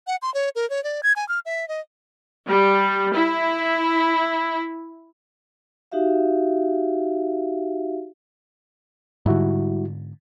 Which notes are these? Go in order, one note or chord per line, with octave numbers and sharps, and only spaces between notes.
F#5
C6
C#5
A#4
C#5
D5
G#6
G#5
F6
E5
D#5
G3
E4
D#4 F#4 G4 E5 F5
G#2 D3 G3 E4 F#4